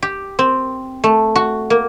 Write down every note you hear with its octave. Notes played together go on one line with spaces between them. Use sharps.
G4
C4
A3
F#4
A#3